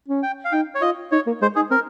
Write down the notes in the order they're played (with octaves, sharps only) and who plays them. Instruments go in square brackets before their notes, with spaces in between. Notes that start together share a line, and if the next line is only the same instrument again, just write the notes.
[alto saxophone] C#4
[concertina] G5
F5
[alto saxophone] D#4 [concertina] G5
[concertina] C#5
[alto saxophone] F4 [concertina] D#5
[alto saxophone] D#4 [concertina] C#5
[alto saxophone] A#3
[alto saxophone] G#3 [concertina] C5
[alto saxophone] D#4 [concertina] G#4
[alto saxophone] C4 [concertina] A#4